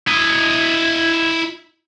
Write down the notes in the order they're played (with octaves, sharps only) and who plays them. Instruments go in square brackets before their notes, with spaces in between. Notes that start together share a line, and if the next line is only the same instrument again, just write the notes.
[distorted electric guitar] E4 D#5